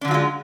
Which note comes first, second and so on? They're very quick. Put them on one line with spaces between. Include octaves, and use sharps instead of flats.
D4 D3 F#3 F4 G#3